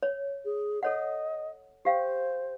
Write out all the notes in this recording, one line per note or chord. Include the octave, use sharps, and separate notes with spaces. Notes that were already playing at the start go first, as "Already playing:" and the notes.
C#5
G#4
A4 C#5 D#5 F#5
G4 C5 F5 G5